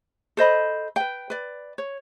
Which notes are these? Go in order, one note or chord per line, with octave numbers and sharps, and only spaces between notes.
A4 C5 D#5 B5
B4 G5
B4 D5
C#5